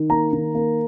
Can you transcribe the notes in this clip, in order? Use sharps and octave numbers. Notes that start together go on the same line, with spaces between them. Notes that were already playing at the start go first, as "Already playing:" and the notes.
Already playing: D#3
A#3 A#5
D#3
A#3